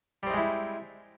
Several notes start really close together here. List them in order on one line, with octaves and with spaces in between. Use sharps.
G3 C4 D#4 G#3 E4